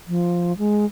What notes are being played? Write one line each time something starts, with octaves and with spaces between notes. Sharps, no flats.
F3
G#3